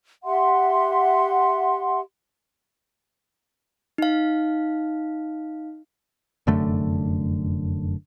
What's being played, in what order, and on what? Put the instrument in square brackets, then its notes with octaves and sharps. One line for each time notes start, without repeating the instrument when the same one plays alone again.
[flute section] G4 E5 F#5 C6
[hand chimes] D#4 F5
[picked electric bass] F1 F#2 D3 A3